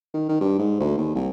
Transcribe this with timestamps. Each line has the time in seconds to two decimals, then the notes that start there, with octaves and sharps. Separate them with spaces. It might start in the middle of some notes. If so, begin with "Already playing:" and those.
0.14 D#3
0.29 D#3
0.41 G2
0.59 G#2
0.80 D2
0.98 D#2
1.15 C2